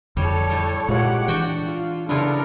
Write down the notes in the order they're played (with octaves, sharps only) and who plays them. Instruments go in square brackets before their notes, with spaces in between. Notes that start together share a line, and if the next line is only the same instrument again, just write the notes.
[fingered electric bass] F2 D3 [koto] G3 [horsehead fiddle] A4 C#5
[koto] A2 G3
[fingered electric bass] A#2 [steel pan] G#3 F4 C#5 [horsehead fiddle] G4 F#5
[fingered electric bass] E3 [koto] D4 F#4 G5
[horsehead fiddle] F4
[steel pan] C#3 D4 [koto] B3 E4 F4 [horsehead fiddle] A4 A#4